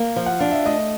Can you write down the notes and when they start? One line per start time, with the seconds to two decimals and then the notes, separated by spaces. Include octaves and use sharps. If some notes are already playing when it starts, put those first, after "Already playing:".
Already playing: A#3
0.16 F3
0.26 F#5
0.39 D4 F5
0.51 E5
0.65 A3 D#5